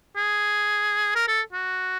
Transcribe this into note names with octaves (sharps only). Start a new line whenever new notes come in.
G#4
A#4
A4
F#4